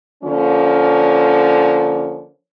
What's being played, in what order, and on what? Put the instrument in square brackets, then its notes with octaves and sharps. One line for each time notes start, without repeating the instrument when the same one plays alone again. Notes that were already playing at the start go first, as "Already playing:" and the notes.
[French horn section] D3 F3 A#3 C#4